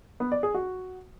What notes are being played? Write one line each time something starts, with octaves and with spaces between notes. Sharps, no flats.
B3
D5
G#4
F#4